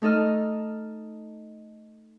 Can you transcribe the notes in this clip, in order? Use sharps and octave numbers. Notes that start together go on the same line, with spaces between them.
A3 D#4 A4 D#5 F6